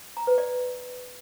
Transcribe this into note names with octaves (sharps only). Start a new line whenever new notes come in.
A#5
B4
D5